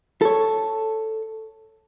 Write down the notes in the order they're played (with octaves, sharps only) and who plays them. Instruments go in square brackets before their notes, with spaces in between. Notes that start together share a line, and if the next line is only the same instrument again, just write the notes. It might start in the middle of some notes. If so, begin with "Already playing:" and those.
[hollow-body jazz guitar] A4 C#5